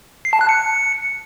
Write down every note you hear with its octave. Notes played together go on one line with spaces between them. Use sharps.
C7
A5
F#6
C#7